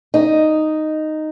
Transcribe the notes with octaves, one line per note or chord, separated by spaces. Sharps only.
D#4